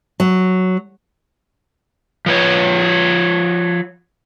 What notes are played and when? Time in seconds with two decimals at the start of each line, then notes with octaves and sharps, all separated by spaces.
0.20 F#3
2.26 F3 B4 C#5